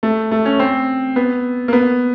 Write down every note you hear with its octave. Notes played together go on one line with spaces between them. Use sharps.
A3
A3
C#4
C4
B3
A#3
B3